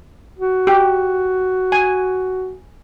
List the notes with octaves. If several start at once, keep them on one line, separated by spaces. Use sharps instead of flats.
F#4
G4
G#5